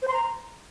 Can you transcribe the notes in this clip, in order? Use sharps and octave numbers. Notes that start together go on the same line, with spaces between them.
C5
C6
A#5